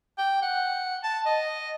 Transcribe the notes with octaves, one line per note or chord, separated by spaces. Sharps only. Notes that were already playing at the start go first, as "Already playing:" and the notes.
G5
F#5
A5
D#5